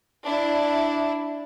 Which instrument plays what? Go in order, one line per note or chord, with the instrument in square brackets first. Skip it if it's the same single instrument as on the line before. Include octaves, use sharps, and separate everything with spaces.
[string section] D4 E4